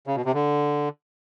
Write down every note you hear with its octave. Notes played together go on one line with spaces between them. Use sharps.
C#3
B2
C3
D3